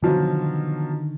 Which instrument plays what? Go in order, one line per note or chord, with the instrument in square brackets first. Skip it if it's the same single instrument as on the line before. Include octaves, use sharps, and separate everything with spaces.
[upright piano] B2 F3 F#3 [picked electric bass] D3 D#3